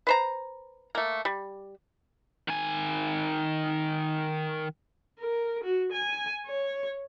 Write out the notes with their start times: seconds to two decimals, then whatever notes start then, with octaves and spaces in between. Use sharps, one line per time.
0.07 B4 C5 A#5
0.95 A3 A#3
1.25 G3
2.48 D#3 G#5
5.19 A#4
5.64 F#4
5.92 G#5
6.46 C#5